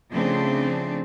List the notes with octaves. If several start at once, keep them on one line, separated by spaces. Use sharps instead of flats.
C#3 F3 A3 C4 D4